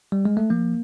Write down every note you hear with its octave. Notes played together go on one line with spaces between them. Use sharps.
G3
G#3
A3
F3 A#3